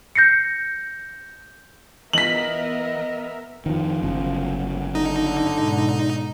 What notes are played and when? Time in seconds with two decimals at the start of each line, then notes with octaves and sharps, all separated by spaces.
0.15 G6 A#6 C7 C#7
2.13 E3 B3 A#4 D#5 E5 B6 F#7
3.66 F2 D#3 F3
4.03 G1 C#3 F#3
4.95 D3 D#4
5.56 G#2 B2